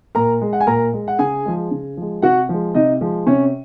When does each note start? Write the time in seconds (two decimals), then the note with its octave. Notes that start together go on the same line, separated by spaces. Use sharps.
0.15 A#2 A#4 A#5
0.42 G#3
0.53 F#5
0.60 G#5
0.67 A#2 A#4 A#5
0.93 G#3
1.08 F#5
1.19 C#3 G#4 G#5
1.46 F3 G#3
1.71 C#3
1.97 F3 G#3
2.22 C3 F#4 F#5
2.49 F3 G#3
2.75 C3 D#4 D#5
3.01 F3 G#3
3.27 C3 C#4 C#5